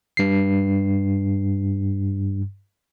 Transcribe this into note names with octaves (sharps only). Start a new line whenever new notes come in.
G2 C7